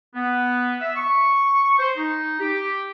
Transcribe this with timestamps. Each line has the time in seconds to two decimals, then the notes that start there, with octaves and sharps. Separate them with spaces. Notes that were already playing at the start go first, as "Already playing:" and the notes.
0.15 B3
0.80 E5
0.96 C#6
1.79 C5
1.97 D#4
2.40 G4